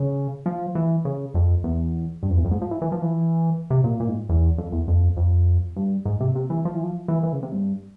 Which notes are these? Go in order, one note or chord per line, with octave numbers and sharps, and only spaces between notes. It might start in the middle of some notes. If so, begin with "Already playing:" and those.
Already playing: C#3
F3
E3
C#3
F2
E2
G2
F2
E2
F2
G#2
F3
E3
E3
F3
E3
C3
A#2
A#2
G#2
E2
F2
E2
F2
F2
G2
G#2
C3
C3
E3
F3
E3
F3
E3
E3
C#3
C3
G2